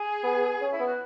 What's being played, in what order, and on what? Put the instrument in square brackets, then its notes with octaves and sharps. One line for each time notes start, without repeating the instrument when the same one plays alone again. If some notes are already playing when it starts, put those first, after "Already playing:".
Already playing: [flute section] G#4
[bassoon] B3
C#4
[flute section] E4
[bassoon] B3
[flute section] F#4